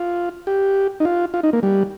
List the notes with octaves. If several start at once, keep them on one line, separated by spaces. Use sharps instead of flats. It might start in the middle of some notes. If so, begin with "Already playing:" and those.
Already playing: F4
G4
D#4
F4
F4
D#4
A#3
G3